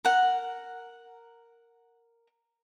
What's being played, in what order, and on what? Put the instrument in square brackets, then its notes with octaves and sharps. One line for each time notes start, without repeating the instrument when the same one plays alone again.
[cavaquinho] A#4 F#5